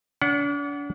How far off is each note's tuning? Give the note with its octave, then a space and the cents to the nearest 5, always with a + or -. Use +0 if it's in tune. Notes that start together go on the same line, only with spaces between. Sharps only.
D4 -40 F#5 +0